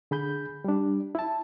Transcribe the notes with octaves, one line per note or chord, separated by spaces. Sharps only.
D3 G#4 B5 G6
G3 D4
E4 A5